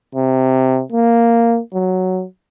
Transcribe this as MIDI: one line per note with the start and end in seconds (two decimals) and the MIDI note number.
0.15 0.82 48
0.92 1.60 58
1.74 2.24 54